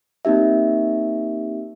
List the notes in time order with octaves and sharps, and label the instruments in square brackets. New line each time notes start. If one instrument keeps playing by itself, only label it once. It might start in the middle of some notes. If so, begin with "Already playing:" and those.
[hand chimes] A#3 C4 D#4 G4 E5